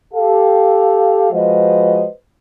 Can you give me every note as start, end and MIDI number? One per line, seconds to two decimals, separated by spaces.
0.14 1.28 67
0.14 1.28 69
0.14 1.28 77
1.32 2.06 53
1.32 2.06 56
1.32 2.06 66
1.32 2.06 71
1.32 2.06 72
1.32 2.06 75